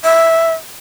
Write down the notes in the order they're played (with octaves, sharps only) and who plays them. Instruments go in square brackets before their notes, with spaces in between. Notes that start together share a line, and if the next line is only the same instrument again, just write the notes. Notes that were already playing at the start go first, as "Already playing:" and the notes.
[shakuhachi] E5